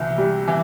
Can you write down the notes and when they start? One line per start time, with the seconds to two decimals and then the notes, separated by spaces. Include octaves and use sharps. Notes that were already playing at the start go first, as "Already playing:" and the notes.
Already playing: C2 E3
0.18 G3
0.47 E3